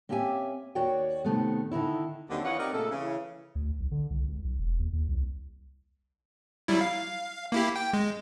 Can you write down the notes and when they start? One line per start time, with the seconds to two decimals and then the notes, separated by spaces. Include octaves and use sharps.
0.09 A#3 C4 C#4 G4 E5 G#5
0.75 D#2 F#4 C#5 D5 G5
1.24 C3 D#3 A3 B3
1.72 D3 D#3 D#4 E4
2.29 D#2 D3 D#3 F#3 C4 D4
2.44 E3 F4 C#5 D#5 F#5
2.58 C4 D#4 G4 A#4 D5 F#5
2.72 A#2 C#3 A3 A4
2.90 C#3 E3
3.55 D2
3.80 B1
3.91 D3
4.10 C2
4.28 C#2
4.45 B1
4.58 E1
4.79 D#2
4.93 D#2
5.09 C2
6.68 F#3 G3 E4
6.81 F5
7.52 A#3 E4 G4
7.76 G5
7.93 G#3